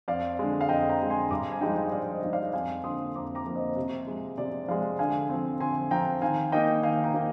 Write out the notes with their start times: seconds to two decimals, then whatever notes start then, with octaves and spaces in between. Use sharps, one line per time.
0.08 F2 D5 F5
0.39 D3 G#3
0.61 F5
0.69 F2 D#5 G5
0.89 G5 A#5
1.00 D3 G#3
1.10 G#5 C6
1.31 G2 A#5 D6
1.52 G#5
1.61 F3 G#3 D#4 D#5 G5
1.92 G2 D5 F5
2.12 C5 D#5
2.22 F3 G#3 D#4
2.33 D5 F5
2.53 F2 F5 G#5
2.84 D3 F3 A#3 C6 D#6
3.15 F2 A#5 D6
3.35 A#5 D6
3.45 D3 F3 A#3
3.55 C5 D#5
3.76 C3
4.07 F3 G#3
4.38 C3 D5
4.68 F3 G#3 D5 F5
4.99 D3 F5 G#5
5.29 F3 C4
5.60 D3 G#5 C6
5.91 F3 C4 G5 A#5
6.22 D#3 F5 G#5
6.52 A#3 D#4 D#5 G5
6.83 D#3 F5 G#5
7.04 G5 A#5
7.14 A#3 D#4